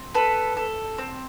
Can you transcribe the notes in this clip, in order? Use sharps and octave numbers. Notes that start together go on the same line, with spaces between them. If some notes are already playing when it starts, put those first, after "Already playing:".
Already playing: C4
A4 B4
A4
C4